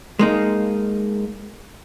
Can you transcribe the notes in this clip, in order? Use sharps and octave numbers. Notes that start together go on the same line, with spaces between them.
G#3 A#3 D#4